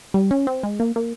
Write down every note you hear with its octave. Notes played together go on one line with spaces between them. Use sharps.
G3
C#4
C4
G#3
A#3
A#3